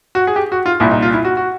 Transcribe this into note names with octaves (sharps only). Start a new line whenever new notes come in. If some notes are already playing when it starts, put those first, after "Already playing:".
F#4
G#4
G4
F#4
F4
C2 A#2 E4
D#4
F4
E4
F#4
F#4